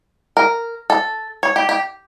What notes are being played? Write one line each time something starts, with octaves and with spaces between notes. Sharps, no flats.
A#4
A4
C#5
G4
G4